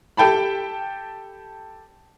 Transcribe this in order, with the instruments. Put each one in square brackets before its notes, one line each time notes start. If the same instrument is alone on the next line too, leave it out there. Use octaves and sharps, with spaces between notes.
[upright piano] G4 A4 G5 A5 B5